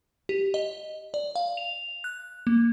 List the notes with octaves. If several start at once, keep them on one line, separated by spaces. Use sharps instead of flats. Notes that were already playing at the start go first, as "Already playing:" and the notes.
G4
D#5
D5
F5
F7
F#6
A#3